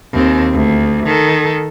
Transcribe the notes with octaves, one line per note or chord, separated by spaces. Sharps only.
D#2 C4
D2
D#3 A4